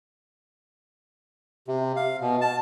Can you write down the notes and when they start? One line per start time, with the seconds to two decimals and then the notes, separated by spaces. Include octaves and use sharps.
1.68 C3
1.96 F5
2.21 B2
2.41 A5